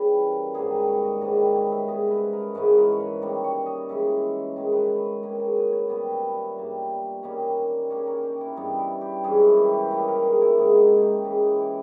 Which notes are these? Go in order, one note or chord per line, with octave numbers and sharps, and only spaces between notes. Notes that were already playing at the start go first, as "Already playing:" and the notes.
Already playing: C#3 E3 G3 B4
A#4
G#2 D#3 G3 A#3 G#4
B4
C#5
D#5
G#2 D#3 G3 D#5
B4
C#5
E5
B2 G#3 C#4 D#5
B4
A#4
G#2 E3 G#3 C#4 B4
A#4
C#5
B4
D#3 G3 A#3 C#5
C#5
D#5
C#3 E3 G#3 E5
D#3 G#3 C#4
B4
C#5
B4
D#3 A#3 C#4 A#4
G#4
B4
C#5
A#2 G3 B3 B4
C#5
E5
G2 G3 A#3
D#3 G3 A#3 C#4
D#3 A#3 C#4 C#5
A#4
G4
E4
G2 G3 B3 D#4
E4
G4
G2 E3 G#3 C#4 G#4
A#4
G4
E4 G4
D#3 A#3 C#4 B4
A#4
G#4
E4
G#2 D#3 G#3 E4
D#4
G4
C#3 E3 G#3 G#4
G4
E4